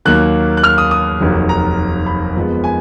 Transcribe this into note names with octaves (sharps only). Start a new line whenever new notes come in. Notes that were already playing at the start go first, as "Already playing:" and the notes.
D#2 D#3 F#3 A#3 F#6
F#6
F6
D#6
D#6
F1 D#2 D#3 F#3
A#5
B5
F2 F3 G#3 B3
G#5